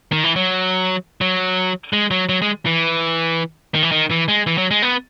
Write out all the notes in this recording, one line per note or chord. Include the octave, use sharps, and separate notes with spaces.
D#3
E3
F#3
F#3
G#3
F#3
F#3
G#3
E3
D#3
E3
D#3
E3
G#3
E3
F#3
G#3
B3